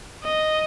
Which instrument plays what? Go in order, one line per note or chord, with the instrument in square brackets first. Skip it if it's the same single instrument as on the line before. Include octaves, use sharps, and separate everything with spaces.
[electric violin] D#5